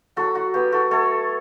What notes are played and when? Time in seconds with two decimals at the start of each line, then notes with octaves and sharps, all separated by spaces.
0.16 F#3 F#4 A4
0.35 F#4
0.54 B3 G4
0.72 F#4 A4
0.91 A3 A4 C#5